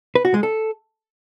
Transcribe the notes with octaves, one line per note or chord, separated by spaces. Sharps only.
B4
F#4
G#3
A4